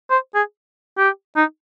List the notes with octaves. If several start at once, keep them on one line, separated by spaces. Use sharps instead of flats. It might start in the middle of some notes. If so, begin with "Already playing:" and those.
C5
G#4
G4
D#4